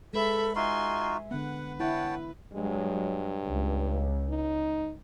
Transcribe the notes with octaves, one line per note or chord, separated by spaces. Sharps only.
G#3 A4 B4 E5 B5
D#4 F4 F#4 E5 G#5 C6
D3 B3 B4 F#5
E4 C#5 F#5 G5 A5
G2 F#3 G#3
C#2
D#4